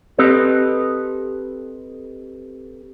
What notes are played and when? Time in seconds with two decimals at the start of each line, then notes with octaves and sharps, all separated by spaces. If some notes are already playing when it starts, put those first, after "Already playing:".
0.18 C4 G4 A4 B4 D#5